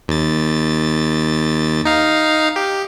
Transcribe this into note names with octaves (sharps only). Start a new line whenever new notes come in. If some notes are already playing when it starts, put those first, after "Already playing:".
D#2 A6
D#4 F5
G4